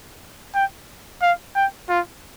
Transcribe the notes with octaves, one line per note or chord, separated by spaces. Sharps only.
G5
F5
G5
F4